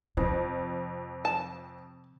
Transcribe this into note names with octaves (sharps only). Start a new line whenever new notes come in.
F2 C3
A5